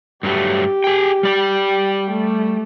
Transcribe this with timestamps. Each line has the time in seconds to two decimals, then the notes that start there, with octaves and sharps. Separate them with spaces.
0.23 G2 F#3 A3 G4
0.84 G#4 G5
1.23 G3 D5 G5
2.11 A3